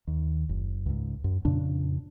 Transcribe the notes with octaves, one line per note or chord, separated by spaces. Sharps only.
D#2
F#1
C#2 G#2
F#2
F2 A#2 C#3 D4